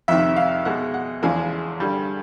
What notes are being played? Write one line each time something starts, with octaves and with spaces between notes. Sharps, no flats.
F2 C3 D#3 E5
F5
B2 G#3 F#5
F#5
E2 C#3 F3 G#3 G#5
G2 D3 G3